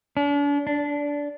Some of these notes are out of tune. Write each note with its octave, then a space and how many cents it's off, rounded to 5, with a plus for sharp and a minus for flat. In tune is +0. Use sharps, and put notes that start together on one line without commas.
D4 -40
D4 -15